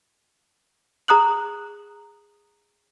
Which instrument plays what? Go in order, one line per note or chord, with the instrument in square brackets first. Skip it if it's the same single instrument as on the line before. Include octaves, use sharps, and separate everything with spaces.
[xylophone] G#4 A#5 D#6 F#6 F#7